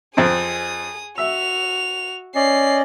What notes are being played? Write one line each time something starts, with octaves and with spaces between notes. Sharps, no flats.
F2 C4 G#4 D#6
F#4 E5 F7
C#4 D5 D#5 C7